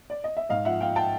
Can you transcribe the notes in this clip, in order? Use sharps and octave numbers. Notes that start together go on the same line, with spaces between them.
D5
D#5
E5
G#2 D#5 F5
F3 E5 F#5
F3 F5 G5
G5 A5